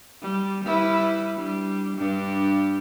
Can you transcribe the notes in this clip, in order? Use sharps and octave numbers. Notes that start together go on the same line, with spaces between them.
G3
G3 E4 B4
G3 D4
G2 D4 G4